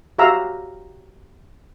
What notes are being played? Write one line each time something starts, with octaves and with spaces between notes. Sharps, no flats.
F#4 G4 E5 F5 A#5 E6